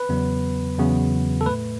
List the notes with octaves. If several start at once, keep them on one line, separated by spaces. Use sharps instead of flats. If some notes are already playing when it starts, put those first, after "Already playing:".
Already playing: B4
E2 C#3 F#3 B3
E2 C#3 F#3 B3
A4
A2 A3 B4